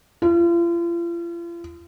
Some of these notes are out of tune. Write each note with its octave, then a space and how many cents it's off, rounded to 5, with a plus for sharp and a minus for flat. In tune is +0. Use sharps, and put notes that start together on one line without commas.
F4 -40